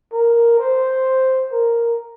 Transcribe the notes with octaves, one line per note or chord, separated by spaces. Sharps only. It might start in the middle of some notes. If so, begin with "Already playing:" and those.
A#4
C5
A#4